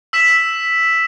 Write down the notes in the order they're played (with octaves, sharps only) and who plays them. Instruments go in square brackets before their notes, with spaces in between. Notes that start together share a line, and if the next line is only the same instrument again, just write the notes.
[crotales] E6 B6 E7